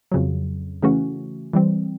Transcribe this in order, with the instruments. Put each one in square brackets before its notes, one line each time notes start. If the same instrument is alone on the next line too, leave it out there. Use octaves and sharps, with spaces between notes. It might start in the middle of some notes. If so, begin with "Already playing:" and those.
[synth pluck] F2 C#3 F#3
C#3 E3 A3 C#4 F#4
E3 G3 C4